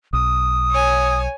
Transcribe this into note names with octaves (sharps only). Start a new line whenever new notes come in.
B1 D#6
C#5 G#5